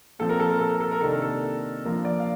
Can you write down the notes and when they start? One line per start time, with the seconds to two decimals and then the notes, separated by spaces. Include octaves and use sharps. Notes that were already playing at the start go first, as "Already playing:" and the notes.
0.19 A#2 F3 C4 A4
0.29 A#4
0.40 A4
0.50 A#4
0.60 A4
0.70 A#4
0.80 A4
0.91 A#4
1.01 C3 D#3 A#3 D4 A4
1.12 A#4
1.22 A4
1.85 A#2 F3 A#3 D4 A#4
2.05 D5
2.20 F5